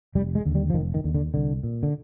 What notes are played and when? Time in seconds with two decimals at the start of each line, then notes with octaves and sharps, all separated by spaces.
0.15 F1 G3
0.35 G#3
0.45 D#2 D3
0.55 G3
0.70 F3
0.74 F1 D#3
0.94 D#3
1.04 D#2 D3
1.15 D3
1.34 C2 D3
1.63 A#2
1.83 D3